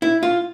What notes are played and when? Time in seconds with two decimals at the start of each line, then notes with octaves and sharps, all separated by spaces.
0.02 E4
0.23 F4